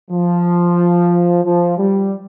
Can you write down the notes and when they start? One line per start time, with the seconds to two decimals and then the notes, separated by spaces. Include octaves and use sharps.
0.11 F3
1.44 F3
1.78 G3